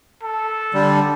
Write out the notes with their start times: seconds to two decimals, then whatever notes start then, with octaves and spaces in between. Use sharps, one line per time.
0.23 A4
0.74 D3 G3